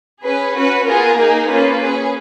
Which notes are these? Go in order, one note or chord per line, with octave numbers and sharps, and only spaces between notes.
C#4 G#4 B4
C#4 F#4 B4
B3 F4 G#4 A#4
A#3 D#4 G#4
A#3 C#4 F4 G#4 B4
C#4 G#4